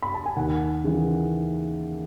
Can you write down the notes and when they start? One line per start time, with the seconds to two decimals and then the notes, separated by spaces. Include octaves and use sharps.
0.02 B5
0.14 A5
0.26 G#5
0.37 D#2 F#5
0.84 C#3 E3